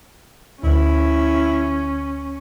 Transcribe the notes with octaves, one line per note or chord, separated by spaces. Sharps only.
D2 C#4 E4